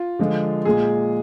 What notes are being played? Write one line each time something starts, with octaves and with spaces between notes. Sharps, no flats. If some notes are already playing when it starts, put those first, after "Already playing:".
Already playing: F4
D3 F3 G#3
A#2 G#3 G#4